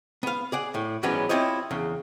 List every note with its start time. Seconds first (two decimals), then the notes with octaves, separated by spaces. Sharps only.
0.23 B3 F5
0.52 G#4 D5 F#5
0.75 A2
1.03 G#2 E3 F#3 G3 B3 C#4
1.29 C4 E4 F4 G4 C#5 D#5
1.71 E2 C#3